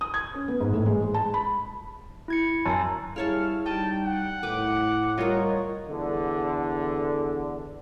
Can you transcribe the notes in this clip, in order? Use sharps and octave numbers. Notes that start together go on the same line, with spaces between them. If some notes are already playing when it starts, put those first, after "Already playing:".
D#6
G#6
C#4
B3
G#2
A2
G#3
G#3
A5
B5
E4 G#6 C#7
F#2 G#5 A5
G3 E4 G#4 C#5 F5 A5 F6
G3 D#4 D#5 G5 A5
F#5
A2 B4 D6
G3 F4 A#4 C#5 D#5
E2 D3